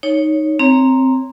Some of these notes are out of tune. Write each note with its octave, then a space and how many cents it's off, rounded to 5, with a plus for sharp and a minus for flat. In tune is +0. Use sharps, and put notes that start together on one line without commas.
D#4 +0 C#5 +0
C4 +0 C#5 +0 A#5 +0